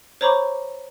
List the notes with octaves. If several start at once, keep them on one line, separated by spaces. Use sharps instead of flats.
C5 C#5 A#5 B5 C#6 D6